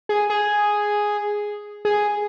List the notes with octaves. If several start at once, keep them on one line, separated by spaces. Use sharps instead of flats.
G#4
G#4
G#4